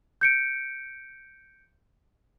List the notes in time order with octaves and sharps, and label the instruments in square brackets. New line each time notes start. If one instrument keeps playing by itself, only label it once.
[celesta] G6 C#7 D7